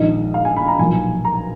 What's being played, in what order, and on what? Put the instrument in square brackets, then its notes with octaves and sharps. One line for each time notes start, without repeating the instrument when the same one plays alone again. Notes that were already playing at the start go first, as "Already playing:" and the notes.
Already playing: [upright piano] A#1 G#2 D#3 D#5
F5
G#5
B5
A#5
B1 A#2 F3 G#5
A#5